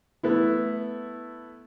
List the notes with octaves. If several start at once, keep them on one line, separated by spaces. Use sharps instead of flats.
A3 B3 E4